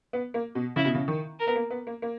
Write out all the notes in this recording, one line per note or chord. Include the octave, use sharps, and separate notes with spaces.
B3
A#3
B2
C#3 E4
B2
C#3
D#3
A#4
B3
A#3
B3
A#3
A#3